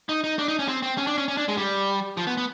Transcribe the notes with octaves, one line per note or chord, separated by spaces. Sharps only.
D#4
D#4
D4
D#4
C#4
C4
C4
C#4
D4
C#4
C#4
D4
G#3
G3
F3
B3
B3